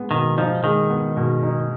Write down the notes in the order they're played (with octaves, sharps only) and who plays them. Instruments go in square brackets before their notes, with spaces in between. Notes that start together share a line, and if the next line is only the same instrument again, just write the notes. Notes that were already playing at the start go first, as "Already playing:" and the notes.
Already playing: [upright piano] G#3 B3
[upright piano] B2 [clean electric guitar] D#3
[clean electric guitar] F3 [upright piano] D#4
[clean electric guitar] D#3 [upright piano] G#3
[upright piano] B3
B2
D#4